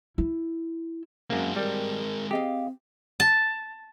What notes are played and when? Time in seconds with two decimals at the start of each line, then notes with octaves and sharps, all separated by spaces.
0.18 E4
1.30 F#2 G#3 A#3 C4
1.56 G3 A#4
2.31 C4 G4 G#4 D#5 F5
3.20 A5